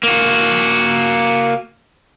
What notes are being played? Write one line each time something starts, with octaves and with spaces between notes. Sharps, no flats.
A#3 F#4